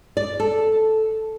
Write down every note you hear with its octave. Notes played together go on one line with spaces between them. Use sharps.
D5
A4